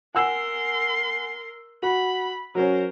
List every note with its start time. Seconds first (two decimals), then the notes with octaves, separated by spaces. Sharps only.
0.15 A#4 F#5 G#5 C6 E6
1.83 F#4 B5
2.55 F#3 C#4 A#4 C5